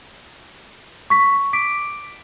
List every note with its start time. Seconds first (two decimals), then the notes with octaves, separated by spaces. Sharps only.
1.10 C#6 B6
1.53 D6 B6 D7